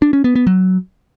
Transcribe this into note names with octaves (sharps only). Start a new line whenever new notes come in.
D4
C#4
B3
B3
F#3